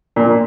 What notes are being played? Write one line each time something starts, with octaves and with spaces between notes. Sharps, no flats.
A#2